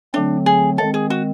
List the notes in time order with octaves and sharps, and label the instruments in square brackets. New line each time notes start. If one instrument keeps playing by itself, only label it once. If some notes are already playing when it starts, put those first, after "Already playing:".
[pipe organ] D3 F#3 A3 C4 [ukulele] D4
[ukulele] G#4
[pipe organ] D#3 G#3 C4 [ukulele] A4
[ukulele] G#4
F#4